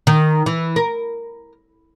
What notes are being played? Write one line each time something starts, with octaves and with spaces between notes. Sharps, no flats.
D#3
E3
A#4